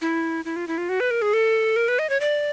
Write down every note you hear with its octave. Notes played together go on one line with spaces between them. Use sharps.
E4
E4
F4
E4
F4
F#4
B4
A#4
G#4
A4
A#4
B4
D#5
C#5
D5